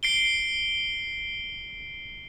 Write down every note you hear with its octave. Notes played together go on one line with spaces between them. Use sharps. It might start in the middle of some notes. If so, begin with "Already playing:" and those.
C7 D7 G7